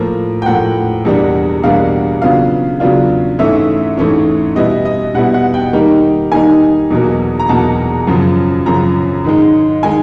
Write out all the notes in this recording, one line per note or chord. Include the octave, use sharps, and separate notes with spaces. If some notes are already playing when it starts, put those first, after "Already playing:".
Already playing: A2 F3 A#3
G5
A2 F3 A#3 F#5
E2 B2 G3 A#3 D4
E2 B2 G3 A#3 D4 F5
C#3 F#3 B3 D4 F4 F5
C#3 F#3 B3 D4 F4
G#2 E3 A3 C#4 E5
G#2 E3 A3 C#4
B2 G3 B3 E4 D#5
D#5
B2 G3 B3 E4 F#5
F#5
G5
D#3 G3 A#3 D#4
D#3 G3 A#3 D#4 G#5
E2 B2 F#3 A#3
A#5
E2 B2 F#3 A#3 A5
F#2 C#3 F3
F#2 C#3 F3 A#5
G#2 D#3 G#3
D#3 G#3 G#5